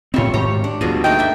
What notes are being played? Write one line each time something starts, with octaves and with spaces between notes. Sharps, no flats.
F2 A2 G3 C4 F4 C#5 E5
G#2 D#3 G4 C#5 A#5
D4
D2 G2 B2 F4 G#4
A3 A#3 D#4 D#5 G5
D4 E5